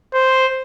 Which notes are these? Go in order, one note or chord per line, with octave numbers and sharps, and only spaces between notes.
C5